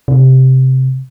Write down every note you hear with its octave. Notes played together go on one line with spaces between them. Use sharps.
C3